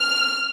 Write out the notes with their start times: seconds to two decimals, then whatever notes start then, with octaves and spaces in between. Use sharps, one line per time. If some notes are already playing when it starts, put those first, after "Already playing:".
Already playing: F6